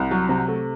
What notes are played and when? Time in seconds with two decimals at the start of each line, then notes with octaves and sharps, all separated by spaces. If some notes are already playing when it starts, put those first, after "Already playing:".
Already playing: C2
0.11 F#3
0.29 C3
0.48 A3